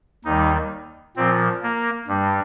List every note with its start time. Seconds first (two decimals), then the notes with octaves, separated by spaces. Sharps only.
0.25 D#2 D#3 G3 D#4
1.16 A#2 F3 C4
1.63 A#3
2.08 G2 G3